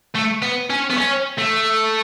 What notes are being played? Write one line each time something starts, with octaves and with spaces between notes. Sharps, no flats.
A3
B3
C#4
B3
C#4
A3